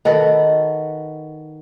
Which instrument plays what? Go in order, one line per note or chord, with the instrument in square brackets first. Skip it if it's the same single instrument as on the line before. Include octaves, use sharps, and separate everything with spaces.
[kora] D#3 F#4 A4 B4